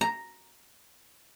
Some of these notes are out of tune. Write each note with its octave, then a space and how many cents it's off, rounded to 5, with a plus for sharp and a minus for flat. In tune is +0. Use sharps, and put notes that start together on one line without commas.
A#5 +0